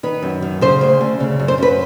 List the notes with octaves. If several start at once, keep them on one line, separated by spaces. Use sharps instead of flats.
D#3 B4
F#2
D#3
C#3 C5
D2
D2
C#3
F#2
C5
F#2 B4